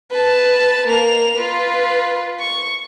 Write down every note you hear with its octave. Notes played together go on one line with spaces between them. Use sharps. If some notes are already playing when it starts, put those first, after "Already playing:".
B4 A5
A#3 F7
F4 B4
C#6